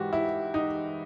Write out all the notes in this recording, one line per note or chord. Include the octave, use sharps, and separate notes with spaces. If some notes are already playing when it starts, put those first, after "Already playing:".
Already playing: G#2 E3 G#3 F#4 G4
E4
D#4